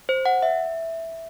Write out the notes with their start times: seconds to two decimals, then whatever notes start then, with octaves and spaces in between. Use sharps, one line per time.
0.09 C5
0.26 F#5
0.43 E5